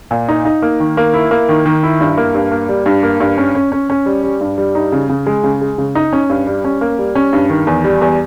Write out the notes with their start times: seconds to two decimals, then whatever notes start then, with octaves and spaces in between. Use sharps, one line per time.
0.11 A#2
0.29 D#4
0.45 D#4
0.62 A#3
0.80 D#3
0.97 A#3
1.14 E4
1.31 A#3
1.49 D#3
1.66 D#3
1.83 E4
2.01 G2
2.17 A#3
2.34 G2
2.51 A#3
2.69 G3
2.86 G2
3.03 A#3
3.20 G2
3.38 C#4
3.55 C#4
3.72 C#4
3.90 C#4
4.06 G3
4.24 G3
4.41 G2
4.58 G3
4.75 D#4
4.92 C#3
5.09 C#3
5.26 G#3
5.44 C#3
5.61 G#3
5.78 C#3
5.95 D#4
6.13 C#4
6.30 G2
6.47 G3
6.64 C#4
6.81 A#3
6.99 G3
7.15 C#4
7.33 G2
7.50 D#3
7.67 E2
7.84 G3
8.01 E2